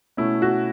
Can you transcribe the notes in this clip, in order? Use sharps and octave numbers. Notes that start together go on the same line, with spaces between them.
B2 A3 C#4 E4
F#4